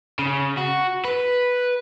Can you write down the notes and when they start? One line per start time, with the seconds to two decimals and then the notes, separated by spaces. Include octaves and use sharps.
0.19 C#3
0.57 F#4
1.05 B4